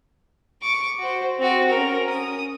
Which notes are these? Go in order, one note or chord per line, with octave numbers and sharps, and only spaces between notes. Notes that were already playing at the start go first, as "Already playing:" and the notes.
C#6 D6
F#4 C5
C4 F#4
C#4 A#4
D#6